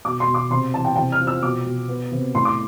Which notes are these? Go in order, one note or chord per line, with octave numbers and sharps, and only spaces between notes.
B2 D6
C6
B2
D6
C3 C6
E3 A5
G5
C3 G5
F6
F3
E6
B2 D6
B2
B3
C3
A2 C6
D6